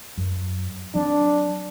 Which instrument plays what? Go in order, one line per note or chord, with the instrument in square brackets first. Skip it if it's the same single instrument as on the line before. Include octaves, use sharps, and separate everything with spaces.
[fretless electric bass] F#2
[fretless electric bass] F#3 C4 [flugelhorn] D4